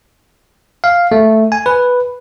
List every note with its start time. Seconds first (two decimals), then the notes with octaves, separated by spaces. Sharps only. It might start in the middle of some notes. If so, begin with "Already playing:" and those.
0.84 F5
1.12 A3
1.52 G#5
1.66 B4